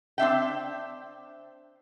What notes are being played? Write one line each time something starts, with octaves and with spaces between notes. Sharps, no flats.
C4 D4 E5 G5